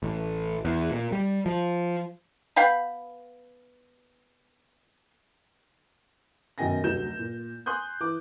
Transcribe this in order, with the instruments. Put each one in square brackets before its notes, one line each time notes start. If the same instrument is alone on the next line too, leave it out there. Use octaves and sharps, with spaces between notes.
[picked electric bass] A1
E2
A#2
G3
F3
[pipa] B3 F5 G5 B5
[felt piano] F#2 B2 D#3 G5 G#5 A#6
F1 D2 F#3 G6 E7
A#2
G#5 C6 D#6 F#6 G6
E3 D6